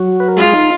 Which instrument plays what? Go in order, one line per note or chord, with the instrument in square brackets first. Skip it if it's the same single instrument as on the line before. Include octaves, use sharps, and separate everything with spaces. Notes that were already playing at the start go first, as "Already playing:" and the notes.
Already playing: [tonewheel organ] F#3 F#4
B4
A#4
[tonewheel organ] G#3 G#4 [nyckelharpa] F4
[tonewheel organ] D#4